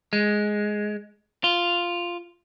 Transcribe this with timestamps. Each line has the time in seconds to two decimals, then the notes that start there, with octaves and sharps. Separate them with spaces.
0.13 G#3
1.44 F4